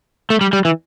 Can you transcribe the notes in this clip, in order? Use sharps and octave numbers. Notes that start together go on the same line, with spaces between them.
A3
G3
G3
E3